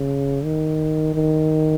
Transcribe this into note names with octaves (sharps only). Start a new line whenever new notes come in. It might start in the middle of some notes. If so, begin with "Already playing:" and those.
Already playing: C#3
D#3
D#3